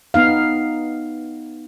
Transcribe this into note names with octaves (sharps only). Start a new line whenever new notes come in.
B3 D#4 F5